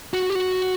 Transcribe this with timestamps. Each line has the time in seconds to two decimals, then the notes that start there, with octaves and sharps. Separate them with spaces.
0.14 F#4
0.30 G4
0.35 F#4